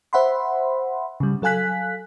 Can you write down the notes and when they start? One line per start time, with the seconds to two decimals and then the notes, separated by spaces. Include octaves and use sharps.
0.13 C5 E5 F#5 B5 C6
1.20 C#3 G3
1.42 F#3 A4 F5 G#5 F#6 B6